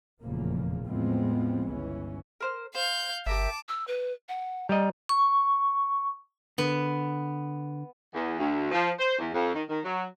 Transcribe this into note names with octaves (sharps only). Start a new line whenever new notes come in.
F1 E2 A#2 C#3 F3 A#3
E2 A2 F3 G#3 B3 C4
G1 C#2 E3 C#4
A#4 C5 F6
C5 F5 G6
G1 G4 A#4 E5 A5 D6
E6
B4
F#5
G3 D#5 A#5
C#6
D3 B3
E2
D2
F3
C5
E2
F2
D#3
D#3
F#3